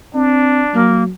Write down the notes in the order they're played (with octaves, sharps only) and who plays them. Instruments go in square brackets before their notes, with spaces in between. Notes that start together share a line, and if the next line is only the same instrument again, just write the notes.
[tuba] C4 [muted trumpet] D4
[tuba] F#3 [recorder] A#3